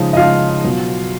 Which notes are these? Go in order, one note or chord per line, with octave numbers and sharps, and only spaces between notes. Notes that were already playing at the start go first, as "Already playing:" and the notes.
Already playing: C#3 F3 G#3 D#4
D#5
C#3 F3 G#3 F4 F5
B2 F#3